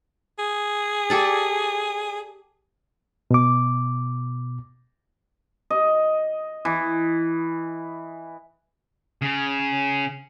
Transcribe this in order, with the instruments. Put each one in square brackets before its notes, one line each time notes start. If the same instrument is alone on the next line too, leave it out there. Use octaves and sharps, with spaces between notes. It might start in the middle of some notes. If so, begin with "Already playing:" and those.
[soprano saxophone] G#4
[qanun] G4 A4 D5
[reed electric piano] B2 D6
[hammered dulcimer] D#5
E3
[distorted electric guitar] C#3